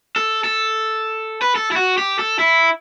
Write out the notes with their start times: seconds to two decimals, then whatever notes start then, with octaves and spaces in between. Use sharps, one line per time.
0.16 A4
0.44 A4
1.41 B4
1.56 A4
1.72 E4
1.76 F#4
1.98 G4
2.19 A4
2.39 E4